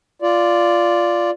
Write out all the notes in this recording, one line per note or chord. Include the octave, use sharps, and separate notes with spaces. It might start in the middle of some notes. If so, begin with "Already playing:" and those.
F4 D5